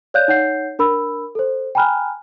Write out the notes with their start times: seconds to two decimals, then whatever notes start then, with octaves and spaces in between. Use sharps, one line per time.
0.14 C#5 D5 F5 F#6 G6
0.28 D#4 C#5 F#5 G6 C7
0.79 D4 A#4 B5 E6
1.35 A4 C5
1.75 G5 G#5 A#5 B5 F6 F#6